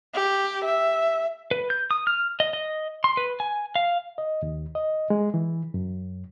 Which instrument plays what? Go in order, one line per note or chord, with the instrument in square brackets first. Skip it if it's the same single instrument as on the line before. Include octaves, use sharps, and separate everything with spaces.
[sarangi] G4
E5
[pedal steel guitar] B4
G6
D#6
F6
D#5
D#5
C6
B4
G#5
F5
[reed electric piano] D#5
D#2
D#5
G#3
E3
F#2